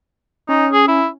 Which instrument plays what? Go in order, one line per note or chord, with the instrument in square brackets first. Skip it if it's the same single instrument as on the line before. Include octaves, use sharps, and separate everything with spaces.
[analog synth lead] C#4 [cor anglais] D#4
[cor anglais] G#4
E4